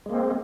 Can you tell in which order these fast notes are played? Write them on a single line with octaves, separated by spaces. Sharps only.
G#3 A#3 C4